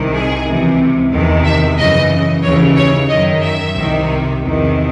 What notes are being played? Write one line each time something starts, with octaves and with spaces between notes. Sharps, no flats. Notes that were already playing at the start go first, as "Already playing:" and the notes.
Already playing: C2 C3 D#3
G#4
C#2 C3 E3
E2 C3 D#3
E5
F#2 C#3 E3 D#5
D#2 C#3 E3 C#5
C#5
F#2 D#3 D#5
E5
C2 C3 D#3
E2 C3 D#3